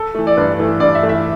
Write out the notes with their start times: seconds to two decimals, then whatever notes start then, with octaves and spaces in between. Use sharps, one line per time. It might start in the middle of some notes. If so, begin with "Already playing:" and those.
Already playing: A4
0.15 E3 A3
0.27 D5
0.37 G2 B4
0.59 E3 A3
0.80 G2 D5
0.95 E5
1.03 E3 A3
1.09 E5